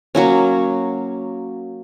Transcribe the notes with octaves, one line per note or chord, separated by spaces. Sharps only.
F#3 A#3 C#4